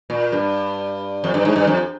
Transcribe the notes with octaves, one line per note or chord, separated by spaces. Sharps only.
A#2
G2
F2
G2
G#2
G2
F2